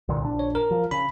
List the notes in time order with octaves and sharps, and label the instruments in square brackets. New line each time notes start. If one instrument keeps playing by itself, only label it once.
[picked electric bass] C2 A#2 D3
A#1 D4
[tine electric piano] C#5
A#4
[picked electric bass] F3
[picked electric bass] C#3 [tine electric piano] B5